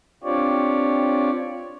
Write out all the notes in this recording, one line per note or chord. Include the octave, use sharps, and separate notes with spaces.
C4 D4 F4 G4 C#5 D5